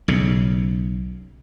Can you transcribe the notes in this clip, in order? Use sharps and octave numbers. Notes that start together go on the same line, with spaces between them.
B1 C#3